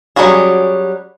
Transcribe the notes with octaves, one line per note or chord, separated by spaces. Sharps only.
F#3 G3 C#4 F#4 G#4